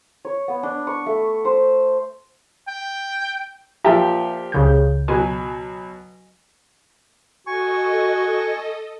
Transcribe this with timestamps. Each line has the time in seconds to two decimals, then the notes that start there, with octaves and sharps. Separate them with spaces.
0.25 C#5
0.48 B3
0.63 D4
0.87 C#6
1.06 A3
1.45 C5
2.68 G5
3.84 A#2 F3 G4 E5 G5 A5
4.52 C#2 C#3 G6
5.08 B2 F#3 G#5
7.47 F#4 A4 D#5 G#5 C#6